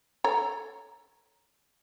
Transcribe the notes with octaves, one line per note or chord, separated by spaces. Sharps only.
A4 C#5 A#5